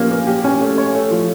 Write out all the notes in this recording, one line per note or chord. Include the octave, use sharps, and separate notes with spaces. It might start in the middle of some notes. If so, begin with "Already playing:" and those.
Already playing: F3 A#3 C#4 G4
A#3
G4
C#4
A3
C#5
A3
F3